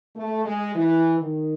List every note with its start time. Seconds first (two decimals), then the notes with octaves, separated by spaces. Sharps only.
0.16 A3
0.45 G#3
0.75 E3
1.20 D#3